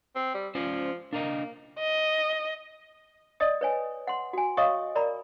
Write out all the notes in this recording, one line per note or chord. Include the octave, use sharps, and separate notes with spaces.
C4
G3
F3 C#4 C5 D5
A#3 D4 A#4 D#5
D#5
D5 D#5 D#6
B4 C#5 G#5
F#5 C6
F#4 G#5
C#5 D#5 F5 C#6 D#6
A#4 D5 A#5 B5